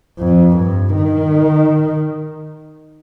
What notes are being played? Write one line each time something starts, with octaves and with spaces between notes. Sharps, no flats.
F2
G2
D#3